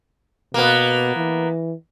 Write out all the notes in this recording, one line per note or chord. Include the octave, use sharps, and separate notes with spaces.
B2 A#3 B3
E3